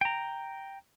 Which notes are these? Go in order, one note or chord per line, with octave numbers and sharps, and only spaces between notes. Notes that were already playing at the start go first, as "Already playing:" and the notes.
G5 A#5